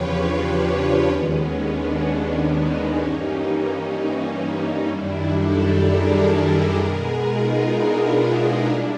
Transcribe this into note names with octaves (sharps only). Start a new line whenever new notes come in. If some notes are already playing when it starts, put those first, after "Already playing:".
Already playing: E2 C#3 F3 F4 G4 B4 C#5
D4
D#2 D#3 G#3 B3 C#4
D4
C#4 D#4
G2 E3 G3 A#3
C#4 D#4
F#2 D#3 G3 D4 E4
G4 A4
G#4 A#4
G#4 A#4
B2 G#3 B3
D#4 F4
D4 E4
G3 A#3